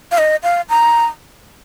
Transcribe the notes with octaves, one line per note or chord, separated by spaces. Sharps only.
F5
D#5
F5
A#5